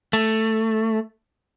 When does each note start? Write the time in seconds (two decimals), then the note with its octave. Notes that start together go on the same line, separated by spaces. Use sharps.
0.13 A3